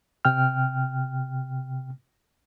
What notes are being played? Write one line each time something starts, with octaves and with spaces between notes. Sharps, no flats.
C3 G5 F6